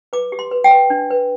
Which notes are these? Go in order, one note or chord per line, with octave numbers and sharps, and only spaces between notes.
B4 D6
G4
C6
B4
G5
B4
D4
B4